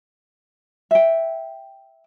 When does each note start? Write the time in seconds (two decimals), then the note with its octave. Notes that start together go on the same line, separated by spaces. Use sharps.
0.91 E5 G5